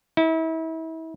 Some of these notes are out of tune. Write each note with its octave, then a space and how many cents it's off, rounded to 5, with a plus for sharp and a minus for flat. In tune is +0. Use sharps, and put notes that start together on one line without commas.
E4 -35